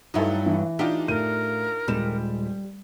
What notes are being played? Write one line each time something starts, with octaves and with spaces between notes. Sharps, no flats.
G2 F#3 D#4 E4 A4
E3
D4 D#4 F4 G4
A2 A#4 D#7
D#1 G3 G#3 E7